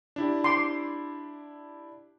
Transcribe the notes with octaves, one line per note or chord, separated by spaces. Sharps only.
D4 E4 G4
C6 D6